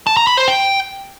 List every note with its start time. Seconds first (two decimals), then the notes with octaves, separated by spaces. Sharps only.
0.07 A5
0.17 A#5
0.27 B5
0.37 C5
0.48 G5